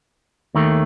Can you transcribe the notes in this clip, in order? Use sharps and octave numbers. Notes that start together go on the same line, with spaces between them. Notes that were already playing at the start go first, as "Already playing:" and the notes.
D#2 D#3 A3